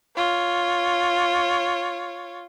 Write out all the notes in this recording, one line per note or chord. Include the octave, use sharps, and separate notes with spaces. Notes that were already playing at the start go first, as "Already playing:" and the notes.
F4 C#5